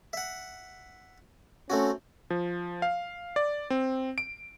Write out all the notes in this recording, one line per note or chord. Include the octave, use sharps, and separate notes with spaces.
E5 F#5
A3 C4 C#4 F#4
F3
F5
D5
C4
D7